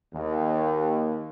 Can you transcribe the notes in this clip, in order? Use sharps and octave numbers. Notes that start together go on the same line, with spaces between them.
D#2